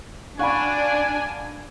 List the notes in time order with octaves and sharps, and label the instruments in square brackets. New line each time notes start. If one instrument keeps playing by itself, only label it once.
[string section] D4 [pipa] F#4 [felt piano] F5 B5 [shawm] G#5